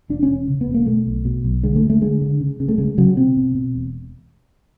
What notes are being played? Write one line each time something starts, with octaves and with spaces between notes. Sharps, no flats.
E1 D4
C#4
E1
C#3
B3
E1
A#3
B2 A3
B1
B2
B1
D3 G#3
A3
D2
A3
D3 G#3
D3
C#3
C#3
A3
C#3 G#3
C#3 F#3
B2 C4
B2
B2
E1